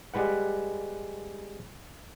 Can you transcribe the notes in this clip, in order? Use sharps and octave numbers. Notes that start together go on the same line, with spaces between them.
G3 G#3 B4 F#5